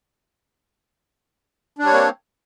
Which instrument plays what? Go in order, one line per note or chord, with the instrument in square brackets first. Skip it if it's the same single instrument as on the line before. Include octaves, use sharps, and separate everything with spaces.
[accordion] D4
G3
C#5
A#3
C4